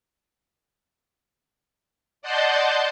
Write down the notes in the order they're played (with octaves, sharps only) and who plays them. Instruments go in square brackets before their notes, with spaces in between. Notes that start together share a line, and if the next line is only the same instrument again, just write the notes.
[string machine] D5 D#5 F#5 A5 C6 G6